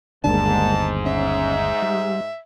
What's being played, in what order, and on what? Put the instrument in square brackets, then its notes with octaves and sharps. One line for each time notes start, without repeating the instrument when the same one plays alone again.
[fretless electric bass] G1 D#2 D4 [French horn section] G#2 [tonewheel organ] G#3 A#3 [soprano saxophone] A5
[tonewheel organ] C#4 [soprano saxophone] E5
[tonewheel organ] G3